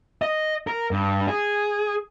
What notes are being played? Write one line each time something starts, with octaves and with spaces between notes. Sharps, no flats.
D#5
A#4
G2
G#4